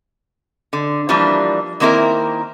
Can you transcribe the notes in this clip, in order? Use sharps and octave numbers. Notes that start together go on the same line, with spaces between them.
D3
E3 F3 G3 A#3 D4
D#3 A#3 C4 E4 A#4